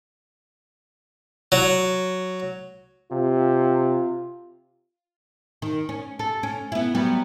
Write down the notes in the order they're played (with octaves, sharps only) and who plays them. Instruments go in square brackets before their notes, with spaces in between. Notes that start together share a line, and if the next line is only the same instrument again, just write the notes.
[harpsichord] F#3
[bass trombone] C3 [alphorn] F4
[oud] D#3
C#4
A4
C#4
B3 E4
F#3 G3 B3